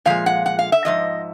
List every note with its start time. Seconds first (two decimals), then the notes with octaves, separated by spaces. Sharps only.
0.05 A#2 F3 G#3 F5
0.26 F#5
0.46 F#5
0.59 F5
0.72 E5
0.85 G#2 F3 D#5